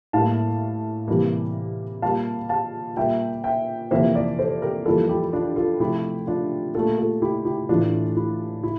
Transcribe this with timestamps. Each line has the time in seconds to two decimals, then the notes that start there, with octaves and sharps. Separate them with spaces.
0.13 A2 G3 A#3 F5 A5
1.08 C3 E3 G3 A#3
2.02 A#2 G3 A#3 F5 A5
2.49 F5 A5
2.97 A#2 G3 A#3 E5 G5
3.44 E5 G5
3.91 F2 C3 E3 A#3 C5 E5
4.15 A#4 D5
4.39 A4 C5
4.62 G4 A#4
4.86 F2 E3 G3 A#3 F4 A4
5.09 E4 G4
5.33 D4 F4
5.56 F4 A4
5.80 C3 F3 A3 E4 G4
6.27 D4 F4
6.75 A#2 A3 F4 A4
6.98 F4 A4
7.22 E4 G4
7.45 E4 G4
7.69 A2 E3 A3 D4 F4
8.17 E4
8.63 E4